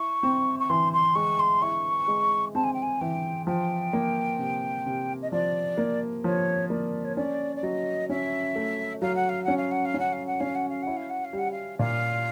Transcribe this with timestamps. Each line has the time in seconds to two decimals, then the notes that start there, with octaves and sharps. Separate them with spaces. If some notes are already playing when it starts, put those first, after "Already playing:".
Already playing: E4 C#6
0.23 C4
0.60 C#6
0.70 E3 C6
0.93 C6
1.15 G#3 C#6
1.39 C6
1.62 E4 C#6
2.08 G#3
2.55 C4 A5
2.64 G#5
2.74 G5
2.82 G#5
3.01 E3 G5
3.47 F3 G5
3.93 A#3
4.39 C3
4.86 C3
5.22 D#5
5.32 F3 D5
5.78 A#3
6.24 F3 C#5
6.70 A#3 D5
7.04 C#5
7.16 C#4 D5
7.56 D5
7.63 F#3 D#5
8.10 C#4 E5
8.56 A3
9.02 F#3 F5
9.15 F#5
9.29 F5
9.44 C#4 F#5
9.57 F5
9.71 F#5
9.85 F5
9.94 C#4
10.00 F#5
10.13 F5
10.26 F#5
10.40 C#4 F5
10.55 F#5
10.69 F5
10.83 E4 F#5
10.97 F5
11.10 F#5
11.25 F5
11.33 G3
11.38 F#5
11.51 F5
11.79 A#2 F5